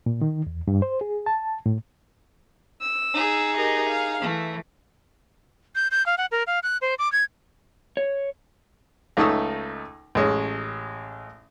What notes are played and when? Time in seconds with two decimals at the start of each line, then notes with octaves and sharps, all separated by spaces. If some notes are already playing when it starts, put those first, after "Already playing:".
0.06 A#2
0.22 D#3
0.47 E2
0.68 G2
0.82 C5
1.01 G#4
1.26 A5
1.66 A2
2.81 E6
3.14 D#4 G#4
3.57 G4 A#4 D#5
3.89 F5
4.21 E3 A3
5.75 G6
5.91 G6
6.06 F5
6.18 F#5
6.32 A#4
6.47 F5
6.63 F#6
6.81 C5
6.99 D6
7.12 G#6
7.97 C#5
9.17 C#2 A3 D#4 C#6 D#6 E6
10.15 A1 G#3 C#4